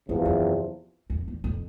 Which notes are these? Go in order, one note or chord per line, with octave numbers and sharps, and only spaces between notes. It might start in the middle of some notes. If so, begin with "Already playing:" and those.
E2 G2 C3 F3
F#2
F2
E2
F2